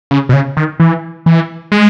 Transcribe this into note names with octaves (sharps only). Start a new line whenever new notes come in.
C#3
B2
C#3
D#3
E3
E3
G#3